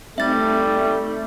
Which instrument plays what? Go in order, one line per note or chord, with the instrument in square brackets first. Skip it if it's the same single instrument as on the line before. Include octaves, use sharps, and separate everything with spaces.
[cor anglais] G3 [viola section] A3 [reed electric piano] C4 D#4 [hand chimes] E5 A6